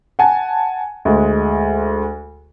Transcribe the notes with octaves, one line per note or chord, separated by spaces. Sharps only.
F#5 G#5 A5
D2 G#3